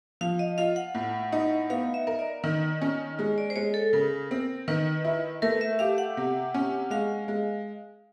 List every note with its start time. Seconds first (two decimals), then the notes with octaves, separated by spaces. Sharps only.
0.21 F3 F5
0.39 D#5
0.58 F4 F5
0.76 F#5
0.95 A2
1.32 D#4
1.70 B3 F5
1.94 E5
2.07 A#4
2.19 D5
2.44 D#3
2.82 C#4
3.19 G#3
3.38 D5
3.50 C5
3.56 G#3 C#5
3.74 A4
3.93 C#3 A#4
4.31 C4
4.68 D#3 B4
5.05 E4
5.42 A3 A#4
5.61 E5
5.79 G4 F5
5.98 F#5
6.17 C3
6.54 C#4
6.91 G#3 F5
7.28 G#3